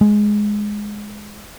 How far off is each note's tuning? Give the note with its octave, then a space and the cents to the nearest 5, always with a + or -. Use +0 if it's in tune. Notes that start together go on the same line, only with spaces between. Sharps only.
G#3 +5